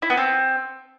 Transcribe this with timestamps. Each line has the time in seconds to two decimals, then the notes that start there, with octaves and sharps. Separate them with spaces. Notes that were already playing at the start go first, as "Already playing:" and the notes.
0.02 E4
0.10 B3
0.17 C4